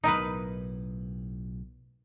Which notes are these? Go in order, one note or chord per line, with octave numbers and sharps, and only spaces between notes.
B1 A2 D#4 A#4 B4